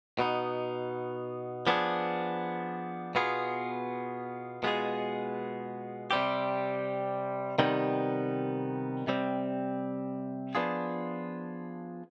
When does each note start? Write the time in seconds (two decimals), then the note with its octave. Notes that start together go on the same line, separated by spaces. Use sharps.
0.19 B2 B3 D#4
1.67 F3 B3 D4 G#4
3.15 B2 B3 F4 G#4
4.63 B2 G#3 B3 F4 G#4
6.11 C3 G3 C4 G4
7.58 C3 D#3 G3 B3 D#4
9.07 C3 G3 C4
10.55 F3 B3 D4 F4 G#4